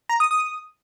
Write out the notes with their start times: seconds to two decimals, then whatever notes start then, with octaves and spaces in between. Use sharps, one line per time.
0.09 A#5
0.20 D#6
0.31 D#6